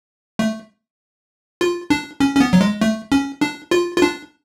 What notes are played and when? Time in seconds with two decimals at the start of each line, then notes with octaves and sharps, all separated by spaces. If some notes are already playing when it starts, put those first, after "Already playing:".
0.39 A3
1.61 F4
1.90 D4
2.20 C#4
2.36 C#4
2.40 B3
2.53 F#3
2.61 G#3
2.81 A3
3.12 C#4
3.41 D4
3.71 F4
3.97 F4
4.02 D4